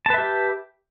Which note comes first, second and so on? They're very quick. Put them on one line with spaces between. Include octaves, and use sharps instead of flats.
A5 B4 E5 G4